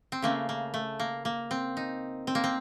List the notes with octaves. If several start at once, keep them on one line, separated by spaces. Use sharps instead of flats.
C4
C#3 A3 A#3
A#3
A3
A#3
A#3
C4
D#4
C4
A#3
C4